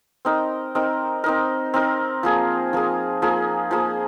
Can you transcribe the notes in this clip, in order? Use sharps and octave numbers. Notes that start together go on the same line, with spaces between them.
C4 D#4 A#4
C4 D#4 A#4
C4 D#4 A#4
C4 D#4 A#4
F3 A#3 G#4
F3 A#3 G#4
F3 A#3 G#4
F3 A#3 G#4